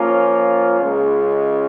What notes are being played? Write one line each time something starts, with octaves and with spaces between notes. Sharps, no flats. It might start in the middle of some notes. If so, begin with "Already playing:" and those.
Already playing: F3 A#3 C#4 F4
C#2 C#3 G#3